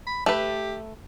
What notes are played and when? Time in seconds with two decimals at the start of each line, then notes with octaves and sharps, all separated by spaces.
0.07 B5
0.26 A3 G4 B4